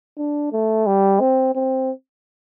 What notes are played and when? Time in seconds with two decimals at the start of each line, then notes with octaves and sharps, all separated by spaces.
0.18 D4
0.52 A3
0.86 G3
1.20 C4
1.55 C4